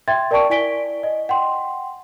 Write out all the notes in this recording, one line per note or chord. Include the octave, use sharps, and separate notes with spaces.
E5 G5 C6 G#6 A6
A#4 D5 G5 A5 C#6 D7
E4 D5 G#5 B6 D7 G7
D#5
F#5 G5 C6